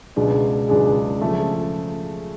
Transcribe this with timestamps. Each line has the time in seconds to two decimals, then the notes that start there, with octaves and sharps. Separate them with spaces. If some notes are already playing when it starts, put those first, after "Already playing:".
0.16 C#2 B2 G#3 D4 G#4
0.69 C#2 B2 G#3 D4 G#4
1.21 C#3 F3 A3